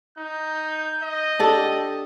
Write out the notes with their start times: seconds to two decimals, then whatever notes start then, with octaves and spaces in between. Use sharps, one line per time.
0.18 D#4 G6
1.02 D#5
1.39 D4 G4 A4